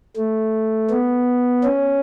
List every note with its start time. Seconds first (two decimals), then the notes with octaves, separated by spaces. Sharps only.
0.16 A3
0.90 B3
1.64 C#4